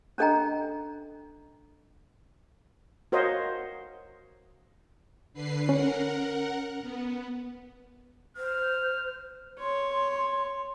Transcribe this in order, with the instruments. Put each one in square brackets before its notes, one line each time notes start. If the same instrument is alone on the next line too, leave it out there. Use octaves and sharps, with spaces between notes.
[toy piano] C#4 D4 A4 D#5 G5 A#5
[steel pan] F#4 A#4 C5 C#5 D#5 F5
[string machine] D3 B4 C7
[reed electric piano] C#4 [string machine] A#4 F#5
[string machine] B3
[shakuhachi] C5 [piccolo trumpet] F6
[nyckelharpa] C#5 [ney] C6